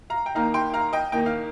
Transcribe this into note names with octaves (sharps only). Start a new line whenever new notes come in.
F5 A#5
G5
D#2 D#3 A#3 D#4 F5 A#5
G5 C6
F5 A#5
D#5 G5
D#2 D#3 A#3 D#4 G5
F5